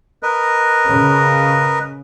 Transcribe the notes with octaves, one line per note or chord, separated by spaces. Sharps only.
A#4 B4 D#5
C#3